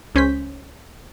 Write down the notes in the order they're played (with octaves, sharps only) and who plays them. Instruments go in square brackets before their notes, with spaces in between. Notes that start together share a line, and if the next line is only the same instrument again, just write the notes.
[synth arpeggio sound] C#2 C#4 C5 G6 B6